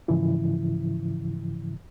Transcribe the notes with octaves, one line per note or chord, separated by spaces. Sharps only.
G#2 C#3 E3 F3 E4